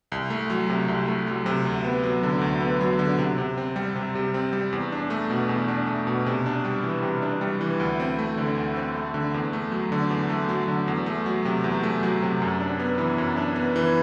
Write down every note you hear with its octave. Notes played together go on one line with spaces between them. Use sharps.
C2
A3
F#3
C3
C2
A3
F#3
C3
D2
B3
F#3
D3
D2
B3
F#3
D3
C3
C3
C4
G3
C3
C3
C4
G3
E2
D4
A3
B2
E2
D4
A3
B2
C3
D4
G3
E3
C3
D4
G3
E3
D2
C4
A3
D3
D2
C4
A3
D3
E2
A3
F#3
D3
E2
A3
F#3
D3
E2
A3
F#3
C3
E2
A3
F#3
C3
F#2
D4
B3
E3
F#2
D4
B3
E3